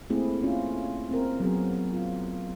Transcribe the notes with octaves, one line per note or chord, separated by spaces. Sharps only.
A3 A#3 C4 E4 G#4
C#4 F4
C4 A#4
F#3 B3 G#4
F4